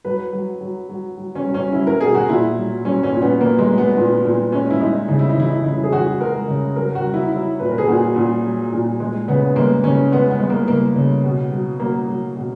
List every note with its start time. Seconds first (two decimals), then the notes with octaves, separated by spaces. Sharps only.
0.05 F#3 B4
0.33 F#3
0.61 F#3
0.89 F#3
1.17 F#3
1.35 C#4
1.45 F#3
1.54 C#4
1.73 F#3 E4
1.87 A#4
2.01 B2 G#4
2.15 F#4
2.29 A#2 E4
2.57 F#3
2.85 F#3 C#4
3.03 C#4
3.12 A#2
3.22 B3
3.41 F#3 A#3
3.59 G#3
3.69 F#3
3.78 B3
3.97 A#2
4.25 A#2
4.52 G#3 C#4
4.70 E4
4.80 G#3 D#4
5.08 C#3 D#4
5.19 E4
5.29 D#4
5.36 E3 E4
5.50 D#4
5.64 C#3 E4
5.84 G#4
5.92 E3 F#4
6.20 G#3 A#4
6.48 C#3
6.76 F#3 A#4
6.95 F#4
7.05 F#3
7.14 E4
7.32 F#3 E4
7.60 A#2 B4
7.69 A#4
7.78 G#4
7.88 A#2 F#4
8.16 A#2
8.45 F#3
8.73 A#2
9.00 G#3
9.28 C#3 B3
9.56 G#3 A#3
9.84 C#3 C#4
10.12 G#3 B3
10.31 B3
10.40 G#3
10.50 A#3
10.68 C#3 A#3
10.96 C#3
11.24 B2
11.51 F#3
11.80 F#3 A#3
12.08 F#3
12.36 B2